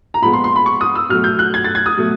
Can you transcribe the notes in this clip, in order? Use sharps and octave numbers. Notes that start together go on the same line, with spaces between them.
A#5
A#2 F3 G#3 B3 B5
C6
C6
B5
C#6
D#6
E6
B2 F#3 A3 F6
G6
F#6
G#6
A6
G#6
D#6
B2 F#3 A3